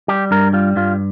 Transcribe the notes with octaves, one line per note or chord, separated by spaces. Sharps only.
G3 G4
G2 A#4
G3 F4
G2 F4